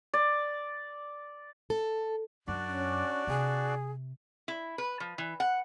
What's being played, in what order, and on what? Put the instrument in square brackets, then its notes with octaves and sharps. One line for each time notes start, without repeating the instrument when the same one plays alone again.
[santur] D5
[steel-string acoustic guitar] A4
[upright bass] F#2 [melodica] D4 F#4 D5
[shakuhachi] C#4
[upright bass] C3 [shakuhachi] G#4
[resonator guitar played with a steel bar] E4
B4
F3
E3
F#5